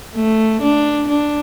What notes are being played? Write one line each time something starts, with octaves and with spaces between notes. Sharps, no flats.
A3
D4
D4